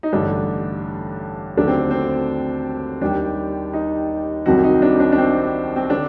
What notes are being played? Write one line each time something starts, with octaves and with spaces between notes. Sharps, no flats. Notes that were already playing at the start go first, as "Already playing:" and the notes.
D#4
A1 G2 D3 A3 D4
D#2 D3 F#3 A3 D4
C4
C4
D#2 D#3 G3 D4
D#4
C2 C3 D#3 F#3 F#4
D#4
D4
D4
D4
C4
C4
D3 D4